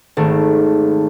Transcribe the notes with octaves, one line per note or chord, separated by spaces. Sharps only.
G#1 A3